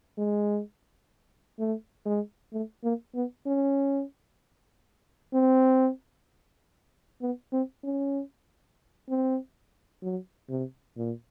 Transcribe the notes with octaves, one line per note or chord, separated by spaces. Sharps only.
G#3
A3
G#3
A3
A#3
B3
C#4
C4
B3
C4
C#4
C4
F#3
C3
A#2